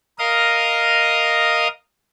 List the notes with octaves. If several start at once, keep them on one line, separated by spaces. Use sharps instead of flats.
A#4 D#5 F5 D#6